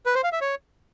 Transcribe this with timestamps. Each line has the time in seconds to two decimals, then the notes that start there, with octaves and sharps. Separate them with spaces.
0.06 B4
0.15 C5
0.24 F5
0.32 E5
0.41 C#5